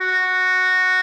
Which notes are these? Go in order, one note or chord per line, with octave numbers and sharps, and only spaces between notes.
F#4